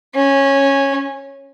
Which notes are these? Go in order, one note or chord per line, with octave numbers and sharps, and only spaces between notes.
C#4